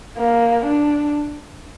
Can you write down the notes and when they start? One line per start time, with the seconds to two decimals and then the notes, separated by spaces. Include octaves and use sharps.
0.18 A#3
0.66 D4